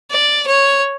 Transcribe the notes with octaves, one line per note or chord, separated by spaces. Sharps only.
D5
C#5